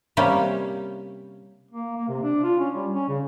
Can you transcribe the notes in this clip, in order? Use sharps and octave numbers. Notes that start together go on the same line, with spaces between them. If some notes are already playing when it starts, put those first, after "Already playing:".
C3 G3 A#3 C#4 G4
A#3
A#3
C3
D4
F4
C#4
G3
C#4
C#3